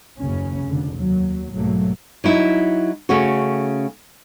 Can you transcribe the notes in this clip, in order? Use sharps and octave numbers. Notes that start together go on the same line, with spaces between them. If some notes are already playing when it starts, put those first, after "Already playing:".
F#1 D#2 C#3 C#4
F1 F2 D3
D#2 F#3
B1 G#2 F#3 A3 A#3
F#3 D#4 E4
C#3 A3 C#4 F#4